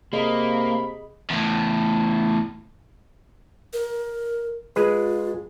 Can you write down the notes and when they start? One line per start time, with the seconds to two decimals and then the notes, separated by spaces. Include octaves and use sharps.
0.13 C3 A#3 G#4 D#5 B5
1.30 E2 A2
3.73 A#4
4.76 G#3 F4 G#4 B4